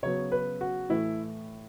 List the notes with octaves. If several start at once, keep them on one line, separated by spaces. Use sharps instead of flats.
C#3 F#3 B3 C#5
B4
F#4
A2 E3 A3 E4